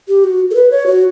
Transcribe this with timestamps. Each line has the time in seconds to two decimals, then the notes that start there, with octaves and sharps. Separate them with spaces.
0.08 G4
0.24 F#4
0.51 A4
0.55 B4
0.71 C#5
0.86 F#4